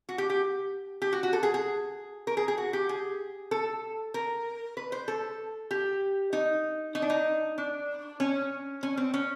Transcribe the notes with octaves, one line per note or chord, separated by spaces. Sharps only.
F#4
G4
G4
G4
F#4
F#4
A4
G#4
G#4
A#4
G#4
G#4
F#4
G4
G#4
A4
A#4
B4
C5
A4
G4
D#4
D#4
D4
D#4
D4
C#4
C#4
C4
C#4